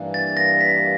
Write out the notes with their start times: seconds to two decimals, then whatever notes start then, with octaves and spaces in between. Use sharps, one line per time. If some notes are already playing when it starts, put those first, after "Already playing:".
Already playing: G2 E3 G3 A#3
0.14 A6
0.37 A#6
0.61 B6